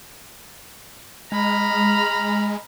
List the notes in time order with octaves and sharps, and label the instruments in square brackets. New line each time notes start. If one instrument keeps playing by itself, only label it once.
[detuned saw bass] G#3 [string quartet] A#5 B5 F6